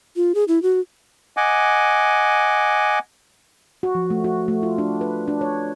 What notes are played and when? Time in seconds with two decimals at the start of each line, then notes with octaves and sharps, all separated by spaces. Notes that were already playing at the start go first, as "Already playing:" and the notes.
0.16 F4
0.35 G#4
0.48 E4
0.62 F#4
1.37 D#5 F#5 G#5 D6
3.83 F#4
3.95 F3
4.10 A3
4.24 F#4
4.48 A3
4.63 F4
4.78 D4
5.01 B4
5.28 D4
5.41 C#5